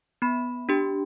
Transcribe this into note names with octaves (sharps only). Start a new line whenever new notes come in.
B3 B5
D4 G4